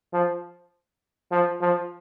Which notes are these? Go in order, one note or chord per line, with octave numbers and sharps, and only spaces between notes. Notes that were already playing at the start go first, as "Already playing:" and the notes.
F3
F3
F3